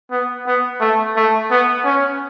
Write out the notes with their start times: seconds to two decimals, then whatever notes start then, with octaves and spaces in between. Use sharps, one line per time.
0.11 B3
0.47 B3
0.81 A3
1.16 A3
1.51 B3
1.85 C#4